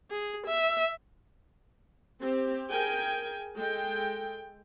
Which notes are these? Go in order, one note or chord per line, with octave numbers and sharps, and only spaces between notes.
G#4
E5
C4 G4
G#4 A#4 G5 G#5
G#3 A4 G5